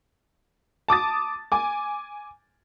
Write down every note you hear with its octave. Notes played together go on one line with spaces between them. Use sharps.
A5 D6 D#6 A6
G#5 D6